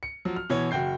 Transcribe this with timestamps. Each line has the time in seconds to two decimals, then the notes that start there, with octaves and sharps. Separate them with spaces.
0.03 C#7
0.25 F3 F#3
0.36 F6
0.50 B2 E3 C#5
0.71 F#1 F#4 G5 G6 C7